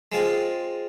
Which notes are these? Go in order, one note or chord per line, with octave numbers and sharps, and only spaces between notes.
G#3 C4 F4 G#4